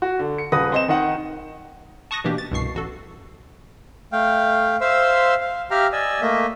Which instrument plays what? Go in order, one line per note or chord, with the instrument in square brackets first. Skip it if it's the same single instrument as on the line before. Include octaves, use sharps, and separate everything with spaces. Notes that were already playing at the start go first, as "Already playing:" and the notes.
[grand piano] F#4
D3
C#7
D#1 C#3 B4 D#6 A#6
C4 D#5 E7
D#3 D#4 F#5
[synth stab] A5 C#6 D#6 F#6 A#6
B2 E3 A#3 D4 G4
A6
C2 G2 B2 C#6 C7
A1 F#4 A4
[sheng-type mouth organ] A3 F5 G5
C5 E5 F5 C6 E6
F5
G4 E5 F5 G5 A#5 F6
D5 D#5 G#5 E6
A3 A#3 D#5 E5